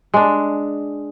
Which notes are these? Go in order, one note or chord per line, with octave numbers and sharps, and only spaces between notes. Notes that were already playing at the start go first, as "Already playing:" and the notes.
G#3 D4